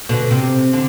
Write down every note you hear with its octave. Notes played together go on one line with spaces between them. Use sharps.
B2 D3
C3
D3